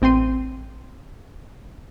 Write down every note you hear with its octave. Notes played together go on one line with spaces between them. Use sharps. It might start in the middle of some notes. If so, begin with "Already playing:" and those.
A1 C4 G5 C6 D#7